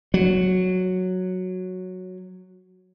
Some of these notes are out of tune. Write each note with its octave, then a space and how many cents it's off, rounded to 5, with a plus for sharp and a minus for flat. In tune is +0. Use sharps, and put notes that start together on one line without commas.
F#3 -5